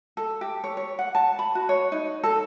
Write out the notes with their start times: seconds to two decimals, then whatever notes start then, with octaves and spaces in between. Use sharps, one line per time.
0.17 A4
0.41 G4
0.64 C#5
0.77 C#5
0.99 F#5
1.15 A5
1.39 B5
1.55 F#4
1.69 C#5
1.92 D#4
2.23 A4